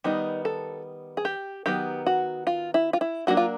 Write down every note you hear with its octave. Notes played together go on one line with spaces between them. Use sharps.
D#3 G3 B3 D#4
A4
G#4
G4
D#3 F#3 B3 G4
F#4
F4
E4
F4
E4
F#3 A#3 D4 F#4
F4